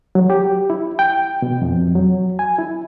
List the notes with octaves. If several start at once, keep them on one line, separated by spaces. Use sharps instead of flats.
F#3
G4
E4
G5
B2
F2
F#3
G#5
E4